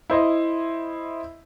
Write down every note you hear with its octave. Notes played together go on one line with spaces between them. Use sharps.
E4 C5 D#5